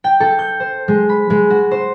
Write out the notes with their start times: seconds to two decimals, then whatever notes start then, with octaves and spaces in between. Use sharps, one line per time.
0.04 G5
0.20 A4
0.39 G6
0.60 C5
0.88 G#3
1.09 B5
1.30 G#3
1.50 F#4
1.71 C5